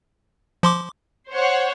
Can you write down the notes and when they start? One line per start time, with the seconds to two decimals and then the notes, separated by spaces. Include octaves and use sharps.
0.63 F3 C6 D6
1.31 C5 C#5 F#5